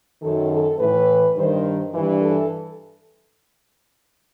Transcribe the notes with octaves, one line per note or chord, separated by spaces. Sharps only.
F#2 D#3 A4
A4
A2 E3 B4
G2 D#3 C5
G2 E3
A4